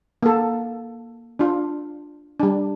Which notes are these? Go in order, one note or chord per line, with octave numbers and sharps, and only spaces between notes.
A#3 A4
D4 F4
G3 D4